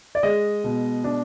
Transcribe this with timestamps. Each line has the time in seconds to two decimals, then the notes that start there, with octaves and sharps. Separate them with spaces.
0.15 D5
0.23 G#3 D#5
0.64 B2
1.04 D4